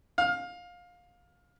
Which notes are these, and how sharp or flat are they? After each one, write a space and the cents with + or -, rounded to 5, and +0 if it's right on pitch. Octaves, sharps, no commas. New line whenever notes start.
F5 +20